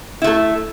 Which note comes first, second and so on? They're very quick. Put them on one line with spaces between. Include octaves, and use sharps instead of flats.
E4 A3 A4